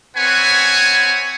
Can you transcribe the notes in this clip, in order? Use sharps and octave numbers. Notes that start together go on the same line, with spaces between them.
C4 B4 C#5 F#5 G#5